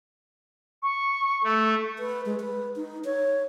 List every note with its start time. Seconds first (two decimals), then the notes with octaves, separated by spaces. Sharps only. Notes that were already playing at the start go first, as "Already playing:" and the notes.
0.83 C#6
1.44 A3
1.99 B4
2.26 G#3
2.40 B4
2.76 D#4
3.05 C#5